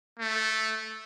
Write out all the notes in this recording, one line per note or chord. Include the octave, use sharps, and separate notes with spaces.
A3